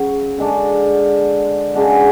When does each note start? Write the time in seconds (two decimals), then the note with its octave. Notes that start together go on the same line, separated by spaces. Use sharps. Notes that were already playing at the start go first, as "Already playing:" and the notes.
Already playing: C#3 F#3 C#4
0.38 D3 G#3 D4
1.75 C#3 G#3 D4 F#4